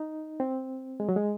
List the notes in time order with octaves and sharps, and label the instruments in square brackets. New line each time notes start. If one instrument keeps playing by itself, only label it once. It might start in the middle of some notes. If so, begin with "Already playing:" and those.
Already playing: [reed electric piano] D#4
C4
G#3
F#3
G#3